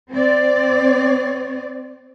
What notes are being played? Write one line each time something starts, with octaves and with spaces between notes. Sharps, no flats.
C4 D5